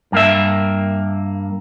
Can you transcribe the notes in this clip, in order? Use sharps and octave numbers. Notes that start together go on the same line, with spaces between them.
G2 A#3 E5